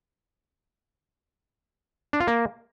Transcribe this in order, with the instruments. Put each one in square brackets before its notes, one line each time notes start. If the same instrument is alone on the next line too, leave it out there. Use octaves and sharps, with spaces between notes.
[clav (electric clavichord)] D4
F4
A#3